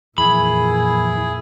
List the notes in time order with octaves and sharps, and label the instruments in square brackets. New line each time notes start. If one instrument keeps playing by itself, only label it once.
[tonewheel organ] F2 E3 [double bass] A#2 [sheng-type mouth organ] E4 G#4 [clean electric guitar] B5